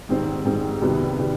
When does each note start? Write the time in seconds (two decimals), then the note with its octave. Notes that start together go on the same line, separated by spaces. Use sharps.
0.09 G#2 D#3 G3 C4
0.45 G#2 D#3 G3 C4
0.82 C2 C3 D#3 G3 B3
1.18 C3 D#3 G3 B3